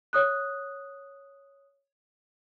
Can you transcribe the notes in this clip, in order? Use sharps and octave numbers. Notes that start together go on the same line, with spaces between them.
C#5 D#6 F#6